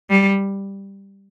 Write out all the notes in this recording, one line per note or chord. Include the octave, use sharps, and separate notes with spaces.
G3